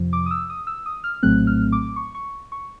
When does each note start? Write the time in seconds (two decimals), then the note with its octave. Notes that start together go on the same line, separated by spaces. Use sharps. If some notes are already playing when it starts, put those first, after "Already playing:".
Already playing: F2 C3 F3
0.13 D6
0.26 D#6
0.31 E6
0.50 D#6
0.67 E6
0.86 D#6
1.04 F6
1.23 A#1 A2 F#3 A3 C4 F#6
1.47 F6
1.72 D6
1.96 C#6
2.15 C#6
2.52 C#6